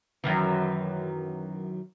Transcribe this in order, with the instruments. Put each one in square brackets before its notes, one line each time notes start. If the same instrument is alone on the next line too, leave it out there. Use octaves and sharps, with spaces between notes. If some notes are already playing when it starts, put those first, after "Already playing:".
[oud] F#2 D#3 E3